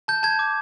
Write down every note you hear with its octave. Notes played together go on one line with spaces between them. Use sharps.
A5 G6
A5 G#6
D6